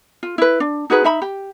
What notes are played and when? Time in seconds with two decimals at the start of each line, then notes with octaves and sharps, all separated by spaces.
0.23 F4
0.38 E4 B4
0.60 D4
0.90 D#4 F#4 G#4 B4
1.04 D#4 E5 B5
1.22 G4